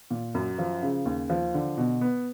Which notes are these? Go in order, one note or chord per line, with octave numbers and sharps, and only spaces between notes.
A#2
F#2
F3
C#3
D#2
F3
D3
B2
B3